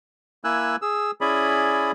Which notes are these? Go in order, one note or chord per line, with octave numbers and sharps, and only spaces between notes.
A#3 E4 G#5 E6 F#6
G#4 E6
C#4 E4 G#4 D5 G#5 B5